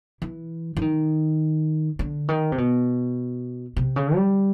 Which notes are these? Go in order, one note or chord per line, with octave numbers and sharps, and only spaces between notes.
E3
E3
D#3
D3
D#3
C3
B2
C3
C#3
G3